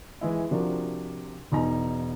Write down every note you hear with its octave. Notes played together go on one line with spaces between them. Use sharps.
E3 G#3 E4
C3 F3 D4 F#4 A#4
E1 D#4 A#5